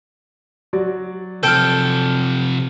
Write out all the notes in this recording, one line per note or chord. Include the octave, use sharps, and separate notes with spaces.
F#3 F#4 D5
C3 F3 A4 G5 A5 F6 G6